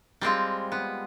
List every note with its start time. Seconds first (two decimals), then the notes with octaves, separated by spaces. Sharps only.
0.21 G3 G#3 C4 F4
0.72 B3